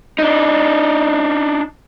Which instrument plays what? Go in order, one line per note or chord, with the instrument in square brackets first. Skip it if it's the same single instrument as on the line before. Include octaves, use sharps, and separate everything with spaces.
[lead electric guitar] D4 D#4